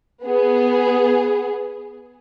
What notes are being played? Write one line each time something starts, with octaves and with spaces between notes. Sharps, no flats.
B3 G#4